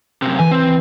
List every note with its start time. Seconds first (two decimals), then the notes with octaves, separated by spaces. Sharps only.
0.22 F#2 C3
0.39 E3 G#5
0.51 C4